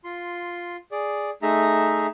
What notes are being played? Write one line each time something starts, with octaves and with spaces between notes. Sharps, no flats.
F4 C6
G#4 D5
A3 D#4 G#4 E5 A#5